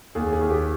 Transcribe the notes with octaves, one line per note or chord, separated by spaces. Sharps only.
D#2 G#4
G#4
D#2
G4